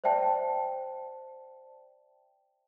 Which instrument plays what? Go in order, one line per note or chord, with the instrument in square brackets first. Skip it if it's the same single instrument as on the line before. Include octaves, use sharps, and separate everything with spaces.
[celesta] C5 D5 E5 G5 A5